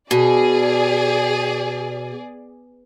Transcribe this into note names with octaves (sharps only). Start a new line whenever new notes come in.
B2 G#4 D5